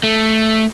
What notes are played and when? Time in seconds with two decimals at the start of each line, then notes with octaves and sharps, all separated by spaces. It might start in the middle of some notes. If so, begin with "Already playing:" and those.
0.03 A3